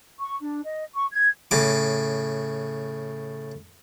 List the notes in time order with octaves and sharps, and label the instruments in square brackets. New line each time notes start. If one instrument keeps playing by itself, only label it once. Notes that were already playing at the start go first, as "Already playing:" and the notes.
[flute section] C#6
D4
D#5
C#6
G#6
[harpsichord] A2 C#3 D6